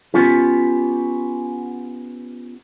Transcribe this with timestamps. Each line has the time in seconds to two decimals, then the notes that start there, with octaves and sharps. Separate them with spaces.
0.14 B3 C#4 F4 G4